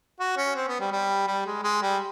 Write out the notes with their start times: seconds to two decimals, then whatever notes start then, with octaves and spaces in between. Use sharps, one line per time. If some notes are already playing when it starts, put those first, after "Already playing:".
0.20 F#4
0.37 C#4
0.55 C4
0.68 B3
0.80 G3
0.92 G3
1.27 G3
1.46 G#3
1.63 G#3
1.82 G3